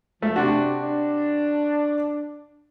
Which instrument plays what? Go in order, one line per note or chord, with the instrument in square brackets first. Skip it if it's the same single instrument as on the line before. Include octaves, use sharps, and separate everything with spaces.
[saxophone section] F3 [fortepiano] A3
[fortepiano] C3 F#4 [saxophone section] D4
[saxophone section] D4